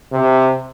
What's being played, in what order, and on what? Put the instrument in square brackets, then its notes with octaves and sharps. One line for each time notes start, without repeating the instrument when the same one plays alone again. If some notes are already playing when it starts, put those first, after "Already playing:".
[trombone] C3